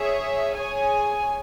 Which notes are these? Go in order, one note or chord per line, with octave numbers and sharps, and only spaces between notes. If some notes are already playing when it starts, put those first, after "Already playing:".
Already playing: G#4 C#5 E5
G#4 C#5 G#5